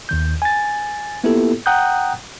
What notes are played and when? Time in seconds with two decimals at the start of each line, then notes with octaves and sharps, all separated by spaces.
0.09 D#2 D#3 G6
0.42 G#5 A6
1.24 A#3 B3 E4 F4 G4 A4
1.66 F#5 G5 A#5 D#6 F#6 G6